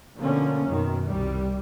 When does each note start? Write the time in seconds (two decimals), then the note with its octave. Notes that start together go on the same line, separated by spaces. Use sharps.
0.17 B2 D3 F3 A#3 C#4
0.67 F#2 B2 D#3
1.07 C2 G3